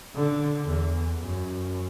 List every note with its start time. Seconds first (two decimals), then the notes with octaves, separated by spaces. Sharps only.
0.15 D3
0.68 E2
1.22 F#2